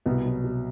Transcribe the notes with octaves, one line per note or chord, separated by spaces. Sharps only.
C2 B2 B3
F#3
B2